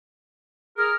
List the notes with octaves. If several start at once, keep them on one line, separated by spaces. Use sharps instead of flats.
G#4 A#4 F6